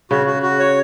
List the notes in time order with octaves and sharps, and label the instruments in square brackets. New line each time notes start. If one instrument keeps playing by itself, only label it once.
[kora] C#3 [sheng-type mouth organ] F#4
[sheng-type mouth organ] F#4
F#4
C#5